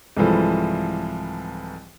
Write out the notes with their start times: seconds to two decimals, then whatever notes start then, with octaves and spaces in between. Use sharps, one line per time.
0.17 C2 G#2 E3 F3 A4